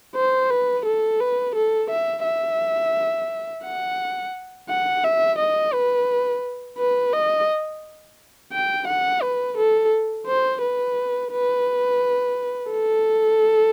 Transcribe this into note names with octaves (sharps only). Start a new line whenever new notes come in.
C5
B4
A4
B4
A4
E5
E5
F#5
F#5
E5
D#5
B4
B4
D#5
G5
F#5
B4
A4
C5
B4
B4
A4